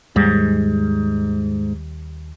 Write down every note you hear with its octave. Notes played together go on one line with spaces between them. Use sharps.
D#2 G#2 G3